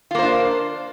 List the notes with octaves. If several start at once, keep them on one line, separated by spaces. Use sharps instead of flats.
A#3 D4 F4 C5